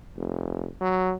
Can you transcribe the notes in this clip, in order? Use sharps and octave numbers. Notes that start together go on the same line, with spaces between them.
F1
F#3